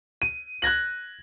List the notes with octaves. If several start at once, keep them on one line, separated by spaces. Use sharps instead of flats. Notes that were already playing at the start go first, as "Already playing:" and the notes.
D#7
F#6 G#6 A#6 F#7